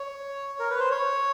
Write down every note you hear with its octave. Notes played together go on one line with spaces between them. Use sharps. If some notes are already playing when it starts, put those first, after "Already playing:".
Already playing: C#5
A#4
B4
C5
C#5